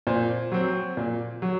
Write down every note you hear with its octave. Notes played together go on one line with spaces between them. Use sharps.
A#2 C5
F#3 C4
A#2
F#3